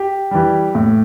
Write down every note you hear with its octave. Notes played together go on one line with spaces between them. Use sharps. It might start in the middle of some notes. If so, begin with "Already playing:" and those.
Already playing: G4
E3 G3
A2